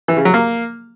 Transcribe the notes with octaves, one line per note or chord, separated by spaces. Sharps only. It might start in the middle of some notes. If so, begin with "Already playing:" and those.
E3
C#3
F#3
A#3